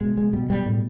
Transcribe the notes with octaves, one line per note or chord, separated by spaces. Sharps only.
B2 G#3
B2 G#3
B2 G3
B2 G3
A2